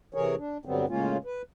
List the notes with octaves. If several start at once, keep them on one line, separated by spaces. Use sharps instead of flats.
C3 E3 G#4 A#4 C#5
D4
G2 D3 F#3 G3 B3 C4
A2 C#3 G#3 A#3 C#4 F4
B4